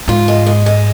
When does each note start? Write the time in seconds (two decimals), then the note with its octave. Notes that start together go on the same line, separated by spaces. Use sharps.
0.08 G#2 F4
0.28 G#3
0.46 G#3
0.66 G#3